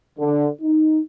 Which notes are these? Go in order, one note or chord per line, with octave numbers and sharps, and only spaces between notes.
D3
D#4